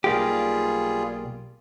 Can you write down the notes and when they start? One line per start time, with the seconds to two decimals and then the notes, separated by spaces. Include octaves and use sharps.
0.04 B1 G3 A#3 F4 G4 G#4